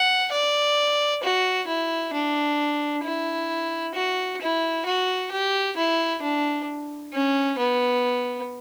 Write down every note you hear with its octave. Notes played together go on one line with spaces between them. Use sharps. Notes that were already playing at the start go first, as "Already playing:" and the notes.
Already playing: F#5
D5
F#4
E4
D4
E4
F#4
E4
F#4
G4
E4
D4
C#4
B3